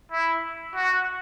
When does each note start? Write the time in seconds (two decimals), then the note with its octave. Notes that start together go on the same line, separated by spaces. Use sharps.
0.12 E4
0.75 F#4